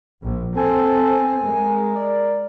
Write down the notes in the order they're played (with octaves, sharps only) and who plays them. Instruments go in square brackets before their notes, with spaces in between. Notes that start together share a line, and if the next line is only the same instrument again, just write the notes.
[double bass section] A#1
[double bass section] C4 [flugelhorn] A4 [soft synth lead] G#5
[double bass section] G#3 [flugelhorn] A#4
[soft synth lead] D5